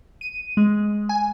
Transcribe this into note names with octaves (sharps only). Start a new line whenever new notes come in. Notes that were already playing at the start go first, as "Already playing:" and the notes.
D#7
G#3
G#5